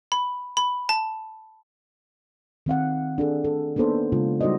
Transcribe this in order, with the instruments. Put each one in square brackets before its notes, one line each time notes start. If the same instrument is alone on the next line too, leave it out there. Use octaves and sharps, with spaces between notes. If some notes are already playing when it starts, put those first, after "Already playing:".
[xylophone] B5
B5
A5
[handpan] D#3 C4 F5 F#5
D4 G#4 A4
A4
A#3 B3 D4 D#4 A4 C5
C#3 G#3 D4 F4
G3 D#4 F#4 C5 D5 D#5